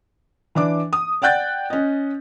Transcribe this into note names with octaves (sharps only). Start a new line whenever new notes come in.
E3 D4 D6
D#6
D5 F#5 G5 F#6 G6 A6
C#4 D#5